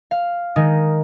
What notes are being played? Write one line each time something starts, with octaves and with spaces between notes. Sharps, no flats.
F5
D#3 G#3 D#4